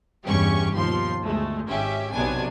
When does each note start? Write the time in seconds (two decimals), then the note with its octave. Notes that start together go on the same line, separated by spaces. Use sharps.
0.25 E2 G2 B2 C#4 G4 C#6
0.71 D#2 B2 F3 C6
1.23 D2 G#3 A3
1.68 G#1 C#4 G4 E5
2.12 B1 C3 F#3 B3 D4 G#5